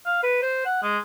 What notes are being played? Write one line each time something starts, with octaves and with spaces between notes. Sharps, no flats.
F5
B4
C5
F#5
G#3